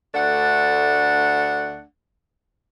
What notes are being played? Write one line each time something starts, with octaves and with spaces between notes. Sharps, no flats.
D2 A3 D4 F#5